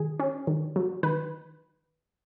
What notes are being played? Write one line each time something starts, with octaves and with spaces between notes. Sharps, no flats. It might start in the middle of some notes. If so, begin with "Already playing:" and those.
Already playing: D#3 G#4
C#4
D#3
F#3
D#3 B4